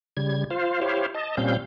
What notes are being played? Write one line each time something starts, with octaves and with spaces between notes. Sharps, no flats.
C#3 G3 G#6
F4 C5 F5
E4 G4 C5 C#5 F5
D#5 A5
A#2 G3 C4 C#4 F5 G6